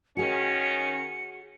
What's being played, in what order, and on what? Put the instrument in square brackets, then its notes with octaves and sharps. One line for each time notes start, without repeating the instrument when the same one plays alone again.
[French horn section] D#3 C#4 [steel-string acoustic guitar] F#4 G#4 [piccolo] C#7